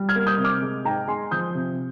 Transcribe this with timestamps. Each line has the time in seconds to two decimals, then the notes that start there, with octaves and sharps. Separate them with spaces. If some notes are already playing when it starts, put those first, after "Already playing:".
Already playing: G3
0.09 F6 G#6
0.15 A#3
0.27 D#6 G6
0.38 C3
0.44 D6 F6
0.62 G#3
0.85 G#2 G5 A#5
1.08 G#3 G#5 C6
1.31 F3 D#6 G6
1.55 C3